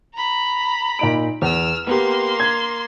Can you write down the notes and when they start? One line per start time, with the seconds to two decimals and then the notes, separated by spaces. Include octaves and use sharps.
0.15 A#5 B5
0.99 A#2 D#4 D7
1.42 E2 E6 F6
1.87 A#3 B3 G4 C6
2.40 G#6